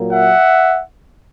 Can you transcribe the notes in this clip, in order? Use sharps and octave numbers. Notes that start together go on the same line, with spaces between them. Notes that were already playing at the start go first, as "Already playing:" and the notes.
Already playing: A#2 F#3 A#3
E5 F#5